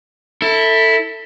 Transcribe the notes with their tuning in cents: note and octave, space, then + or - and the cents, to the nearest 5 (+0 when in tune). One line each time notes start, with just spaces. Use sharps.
E4 -10 A4 +20